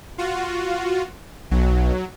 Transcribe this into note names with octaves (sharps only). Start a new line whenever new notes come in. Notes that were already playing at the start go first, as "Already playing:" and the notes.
F4 F#4
B1 F#3